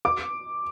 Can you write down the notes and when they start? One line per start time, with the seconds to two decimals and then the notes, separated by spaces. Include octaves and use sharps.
0.05 D6